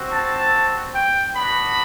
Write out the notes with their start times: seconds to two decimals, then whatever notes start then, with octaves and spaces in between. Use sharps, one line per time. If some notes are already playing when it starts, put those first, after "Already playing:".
Already playing: C4 F#4
0.11 A5
0.95 G5
1.36 B3 D4 F#4 B5